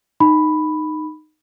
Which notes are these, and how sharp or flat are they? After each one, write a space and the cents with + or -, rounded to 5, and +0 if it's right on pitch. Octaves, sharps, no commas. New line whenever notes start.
D#4 -15 B5 +5